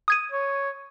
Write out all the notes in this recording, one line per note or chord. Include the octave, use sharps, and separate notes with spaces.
D#6 G#6 D#7
C#5